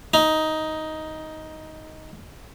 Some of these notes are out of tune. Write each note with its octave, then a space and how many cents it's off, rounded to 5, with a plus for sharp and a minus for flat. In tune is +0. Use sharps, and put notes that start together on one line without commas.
D#4 +10